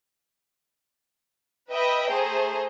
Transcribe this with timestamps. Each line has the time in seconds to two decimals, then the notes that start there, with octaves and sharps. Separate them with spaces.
1.69 B4 D#5 E5 G5 B5
2.10 A3 G#4 C5 A#5